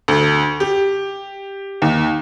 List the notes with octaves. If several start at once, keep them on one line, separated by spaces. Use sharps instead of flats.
D2
G4
D#2